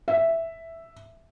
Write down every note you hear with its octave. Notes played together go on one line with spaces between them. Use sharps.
E5